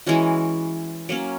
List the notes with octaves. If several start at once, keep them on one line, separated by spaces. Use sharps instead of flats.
E3 G#3 C#4 F#4
F#3 A#3 C#4